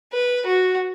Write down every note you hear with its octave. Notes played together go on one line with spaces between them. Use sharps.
B4
F#4